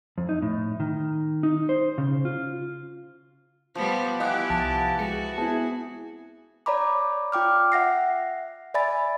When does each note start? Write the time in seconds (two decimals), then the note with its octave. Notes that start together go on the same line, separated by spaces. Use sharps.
0.18 F2
0.29 D#4
0.42 A2
0.80 D#3
1.43 D#4
1.69 C5
1.98 C#3
2.25 F4
3.75 F3 G3 B3 C5
4.20 E3 B3 E4 G4 D#5 F5 G5 F#6
4.50 C2 F3 F5 A5
4.99 G#3 F#4 G#4 C#7
5.38 B3 C4 E4 G#4
6.66 C#5 D5 A#5 B5 D6
7.32 F4 G5 D6 F6
7.72 E5 F#5 A#6 C7
8.74 D5 E5 G#5 B5 A6